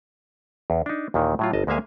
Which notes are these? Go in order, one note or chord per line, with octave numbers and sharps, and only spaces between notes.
E2
D4 D#4
D#2 A#2 D#3 E3
A2 F#3 F4
G1 D#5 A5
D2 G#3 A#3 E5 F5 G#5